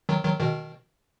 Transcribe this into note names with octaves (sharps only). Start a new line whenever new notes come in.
D#3 F#3
D#3 F#3
B2 D#3